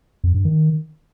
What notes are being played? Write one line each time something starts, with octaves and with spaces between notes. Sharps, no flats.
F2
G2
D#3